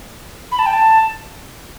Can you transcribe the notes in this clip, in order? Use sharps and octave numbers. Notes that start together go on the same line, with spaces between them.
B5
A5
G5
A5